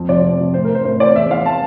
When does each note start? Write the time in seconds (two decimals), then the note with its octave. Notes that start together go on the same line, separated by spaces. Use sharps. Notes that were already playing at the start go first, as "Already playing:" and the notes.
Already playing: F2
0.09 C3 F3 D5
0.24 F2
0.39 C3 F3
0.54 A2 C5
0.64 A#4
0.70 E3 C5
0.85 A2 C5
1.00 E3 D5
1.16 E2 E5
1.30 E3 F5
1.46 A5